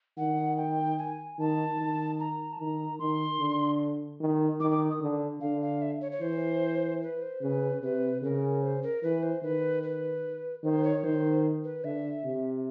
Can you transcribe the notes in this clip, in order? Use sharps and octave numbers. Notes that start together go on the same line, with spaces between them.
D#3 F#5
G5
G#5
D#3 A5
D#3
A#5
A5
D#3 A#5
D#3 C6
D3
D#3
D#3 D6
D6
D#6
D3
D3 F5
F5
E5
C#5
C#5
E3 C5
B4
C5
C#3 B4
C3 B4
C#3 A#4
C5
A#4
E3 B4
C5
D#3 B4
B4
D#3 C5
C#5
D#3 C5
B4
D3 E5
C3